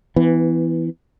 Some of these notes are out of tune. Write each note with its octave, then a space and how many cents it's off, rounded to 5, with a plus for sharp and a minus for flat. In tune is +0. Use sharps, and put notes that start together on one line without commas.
E3 +0 B3 +25